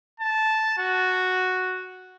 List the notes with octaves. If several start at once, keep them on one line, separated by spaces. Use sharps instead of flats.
A5
F#4